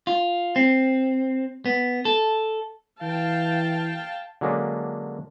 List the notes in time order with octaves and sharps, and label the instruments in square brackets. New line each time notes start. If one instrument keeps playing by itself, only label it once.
[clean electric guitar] F4
C4
B3
A4
[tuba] E3 [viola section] F5 G5 A5
[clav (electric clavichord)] D3 F#3 G#3 A#3 C#4 D4